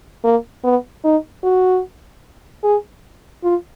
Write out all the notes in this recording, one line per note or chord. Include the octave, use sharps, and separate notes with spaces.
A#3
B3
D#4
F#4
G#4
F4